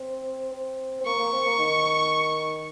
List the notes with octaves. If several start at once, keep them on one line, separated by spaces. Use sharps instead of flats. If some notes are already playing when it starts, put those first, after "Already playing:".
Already playing: C4
C4
C4
A#3 C#6
A#3
C4
A#3
D#3